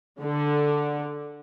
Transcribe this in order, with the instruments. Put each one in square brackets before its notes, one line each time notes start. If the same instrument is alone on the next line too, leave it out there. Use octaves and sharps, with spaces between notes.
[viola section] D3